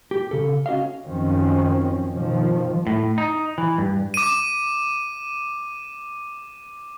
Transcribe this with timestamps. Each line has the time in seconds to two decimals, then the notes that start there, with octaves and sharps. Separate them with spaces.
0.11 G4
0.31 C#3 A4
0.66 C#4 F#4 D#5 F5
1.07 F#2 D#3 F3 C4 C#4
2.11 G2 B2 D#3 F3
2.87 A2
3.18 D#4
3.58 E3
3.78 G2
4.14 D6 D#7